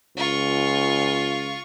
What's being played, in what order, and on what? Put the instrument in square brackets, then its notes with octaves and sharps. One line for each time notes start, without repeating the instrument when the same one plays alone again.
[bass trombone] C#2 [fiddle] F4 C#6